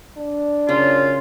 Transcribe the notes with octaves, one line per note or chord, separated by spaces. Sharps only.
D4
F#2 C#3 F4